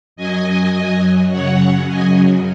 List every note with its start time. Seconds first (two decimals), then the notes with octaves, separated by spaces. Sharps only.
0.16 F#2 F#3 D#5 G#5
1.30 F#2 C#3 F#3 C#5 F#5
1.87 D#5 G#5